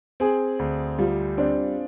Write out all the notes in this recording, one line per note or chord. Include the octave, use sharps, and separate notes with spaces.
C4 G#4
D2
G3 F4
C4 D4